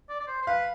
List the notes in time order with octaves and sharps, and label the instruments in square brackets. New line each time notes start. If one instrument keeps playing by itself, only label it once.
[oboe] D5
D5
C5
C5
[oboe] B4 [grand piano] F5